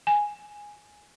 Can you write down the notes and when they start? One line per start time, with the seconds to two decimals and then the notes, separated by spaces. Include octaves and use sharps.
0.07 G#5